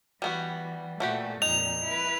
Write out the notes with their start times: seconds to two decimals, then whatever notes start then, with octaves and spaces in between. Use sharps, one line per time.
0.22 E3 G3 B3 F#4
1.00 A#2 E3 A3 F#4 G4
1.42 F2 A#2 D#4 F7
1.85 E4 B4